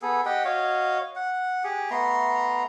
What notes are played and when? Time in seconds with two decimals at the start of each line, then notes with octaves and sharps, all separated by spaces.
0.02 B3 G#4 A4
0.26 G4 D#5 F#5 G5
0.45 F#4 C#5 D#5 F5
1.15 F#5
1.64 G4 G#4
1.90 A3 B3 A#5 C6